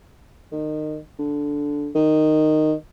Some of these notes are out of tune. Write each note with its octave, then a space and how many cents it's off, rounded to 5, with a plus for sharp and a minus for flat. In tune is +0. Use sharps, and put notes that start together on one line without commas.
D#3 -25
D3 -10
D#3 -10